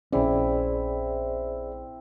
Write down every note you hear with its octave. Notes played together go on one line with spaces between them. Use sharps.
A#1 C4 C#4 E4 G#4 D5